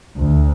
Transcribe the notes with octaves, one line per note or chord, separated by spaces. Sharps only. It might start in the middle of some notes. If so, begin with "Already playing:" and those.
D2